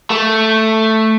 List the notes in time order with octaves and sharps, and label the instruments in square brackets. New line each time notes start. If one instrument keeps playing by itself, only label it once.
[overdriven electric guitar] A3